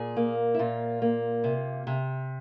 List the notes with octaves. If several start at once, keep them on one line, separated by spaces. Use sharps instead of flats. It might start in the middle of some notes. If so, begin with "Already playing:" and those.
Already playing: A#2 G#4
A#3
E4
A#2 F4
A#3
C3
C3